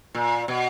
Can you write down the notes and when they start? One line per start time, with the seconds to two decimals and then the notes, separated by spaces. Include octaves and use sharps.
0.15 A#2
0.48 B2